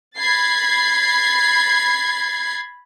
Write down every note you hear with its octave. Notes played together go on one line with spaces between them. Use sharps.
B5 G#6 A6 C7